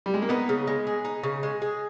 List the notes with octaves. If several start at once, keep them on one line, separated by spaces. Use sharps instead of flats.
G3
G#3
A#3
B3 D#4
C#3
G#3
G#4
D#4
C#3
G#3
G#4